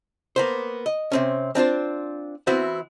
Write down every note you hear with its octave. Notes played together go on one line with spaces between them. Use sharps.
A#3 B3 C5
D#5
C3 C4 C#4
C4 D4 F4 C5
E3 B3 C4 E4 F#4 C5